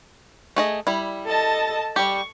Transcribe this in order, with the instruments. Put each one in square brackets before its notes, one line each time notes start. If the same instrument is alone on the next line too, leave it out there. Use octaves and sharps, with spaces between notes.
[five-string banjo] A3 G#4 D#5
G3 E4
[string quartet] A4 D#5 A5
[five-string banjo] G3 G4 [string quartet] C#6